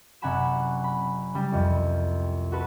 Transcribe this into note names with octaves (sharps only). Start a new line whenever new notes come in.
F#1 C3 F#5 G#5 B5 E7
B5
C#3 G3
C2 F2
F#4 A4 B4